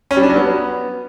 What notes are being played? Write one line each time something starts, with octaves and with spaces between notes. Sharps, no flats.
C#4
G3
D4
F#3
B3